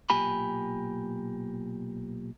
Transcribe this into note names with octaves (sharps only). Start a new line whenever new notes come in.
B1 A#2 G4 G#5 B5